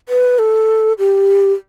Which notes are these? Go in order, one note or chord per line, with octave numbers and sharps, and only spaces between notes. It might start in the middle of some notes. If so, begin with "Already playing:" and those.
B4
A4
G4